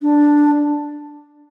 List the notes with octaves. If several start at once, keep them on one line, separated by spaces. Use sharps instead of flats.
D4